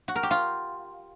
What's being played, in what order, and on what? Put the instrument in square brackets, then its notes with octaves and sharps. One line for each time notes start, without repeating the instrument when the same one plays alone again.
[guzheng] F#4
A#4
G4
F4